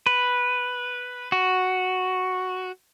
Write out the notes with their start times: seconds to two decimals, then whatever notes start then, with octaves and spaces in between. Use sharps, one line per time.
0.07 B4
1.32 F#4